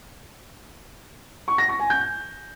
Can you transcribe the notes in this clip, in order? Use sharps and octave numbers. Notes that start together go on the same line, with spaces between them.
C#6
A#6
C#6
G#5
G6